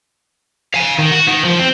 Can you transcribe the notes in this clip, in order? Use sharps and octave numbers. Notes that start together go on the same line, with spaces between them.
F5 G#5
D#3
F#4
D#3
F3
C4